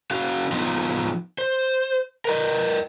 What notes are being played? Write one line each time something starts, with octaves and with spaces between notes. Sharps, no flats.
C#4 F#4 F5
F3 B3 D#4 F4
C5
A#4 B4 D#5